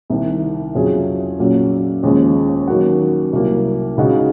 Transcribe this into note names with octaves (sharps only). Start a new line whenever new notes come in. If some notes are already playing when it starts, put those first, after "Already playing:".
C2 C3 D#3
F2 C#3 F#3 C#4 G#4
A#2 F#3 C#4
D#2 C#3 F3 G#3 C#4
D#3 F#3 A#3 C#4 F#4
C2 C3 F#3 A#3
C#2 C#3 G#3 D#4 F#4